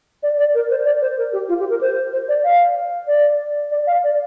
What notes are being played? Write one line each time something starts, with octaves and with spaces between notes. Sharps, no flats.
D5
D5
A#4
C5
D5
C5
A#4
G4
F4
G4
A#4
C5
C5
D5
F5
D5
D5
F5
D5